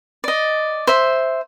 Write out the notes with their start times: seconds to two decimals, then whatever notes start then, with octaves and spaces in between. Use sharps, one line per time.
0.24 D5 D#5
0.87 C5 E5